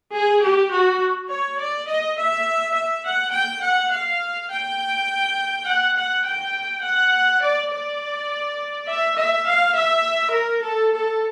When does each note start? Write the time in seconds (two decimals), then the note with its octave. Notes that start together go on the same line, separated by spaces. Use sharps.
0.13 G#4
0.42 G4
0.71 F#4
1.29 C#5
1.59 D5
1.88 D#5
2.17 E5
2.75 E5
3.05 F#5
3.33 G5
3.62 F#5
3.91 F5
4.50 G5
5.67 F#5
5.96 F#5
6.25 G5
6.83 F#5
7.42 D5
7.70 D5
8.87 E5
9.16 E5
9.45 F5
9.75 E5
10.33 A#4
10.62 A4
10.91 A4